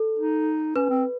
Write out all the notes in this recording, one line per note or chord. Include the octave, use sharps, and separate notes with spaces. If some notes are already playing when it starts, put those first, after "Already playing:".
Already playing: A4
D#4
C#4 B4
C4